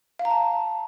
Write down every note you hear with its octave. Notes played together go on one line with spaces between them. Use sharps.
F5
A#5
A5